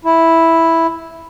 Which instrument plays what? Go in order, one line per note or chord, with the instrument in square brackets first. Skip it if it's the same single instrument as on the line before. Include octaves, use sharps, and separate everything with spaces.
[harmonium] E4